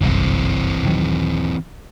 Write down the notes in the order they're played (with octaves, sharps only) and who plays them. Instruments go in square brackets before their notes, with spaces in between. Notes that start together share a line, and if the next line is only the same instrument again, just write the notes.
[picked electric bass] G1 C2 F#2 [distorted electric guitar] E3 C4
[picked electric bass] D#1 D#3 F#3